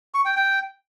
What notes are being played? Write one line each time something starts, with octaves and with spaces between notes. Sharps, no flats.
C#6
G5
G5